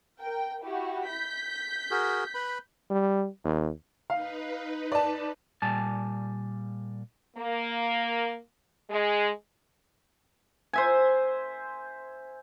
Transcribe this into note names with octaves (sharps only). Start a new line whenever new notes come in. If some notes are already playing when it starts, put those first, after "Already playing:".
A#4 G5
E4 F#4 G4
G6 B6
F#4 G#4 A#4
B4 B5
G3
D#2
D#4 B4 F5
D5 A5
A#2 G3 G#5 A5
A#3
G#3
C5 E5 G#5